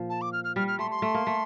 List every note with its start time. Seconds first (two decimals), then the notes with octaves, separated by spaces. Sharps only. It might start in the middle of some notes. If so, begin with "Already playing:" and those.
Already playing: A#2 F3
0.10 A5
0.21 D6
0.33 F6
0.44 F6
0.56 G3 F6
0.68 F6
0.79 A3 C6
0.91 C6
1.02 A3
1.14 A#3
1.27 A3